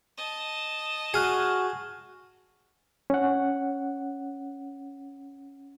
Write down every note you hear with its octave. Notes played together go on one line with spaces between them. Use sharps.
D#5 A5
F#4 G#4 G#5 F6 F#6
C#4 F#5